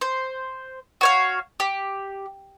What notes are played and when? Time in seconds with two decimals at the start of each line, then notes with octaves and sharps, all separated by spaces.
0.01 C5
1.01 F#4 C#5 F5
1.60 G4